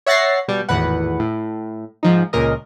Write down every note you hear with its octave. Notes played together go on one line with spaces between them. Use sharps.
C#5 E5 F#5 A6 A#6 C7
B2 G3
G#1 E2 A2 B4 F#5
A2
G#2 F3 D#4
C#2 A#2 A#4 D#5